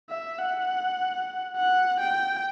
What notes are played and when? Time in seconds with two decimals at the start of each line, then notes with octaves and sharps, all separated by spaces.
0.10 E5
0.39 F#5
1.56 F#5
2.00 G5